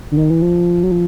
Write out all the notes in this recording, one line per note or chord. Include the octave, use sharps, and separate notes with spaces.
D3
D#3
E3
F3
F#3
F3